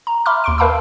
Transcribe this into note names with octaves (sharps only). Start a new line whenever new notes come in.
A#5
E5 B5 C6 D6 F6
D#2 C6 D7
A#4 B4 F5 A5 B5 E6